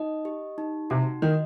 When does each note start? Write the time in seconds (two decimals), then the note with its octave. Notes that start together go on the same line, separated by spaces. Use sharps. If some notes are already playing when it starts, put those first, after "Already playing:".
Already playing: D#4 D#5
0.25 G4
0.58 D#4
0.90 C3 F#4
1.22 D#3 D#5